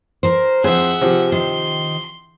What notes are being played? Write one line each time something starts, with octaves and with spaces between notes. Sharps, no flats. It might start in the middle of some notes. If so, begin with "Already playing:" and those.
A#4 C5
F2 G#4 C5 E5 F#5
C3 F3
D#3 C6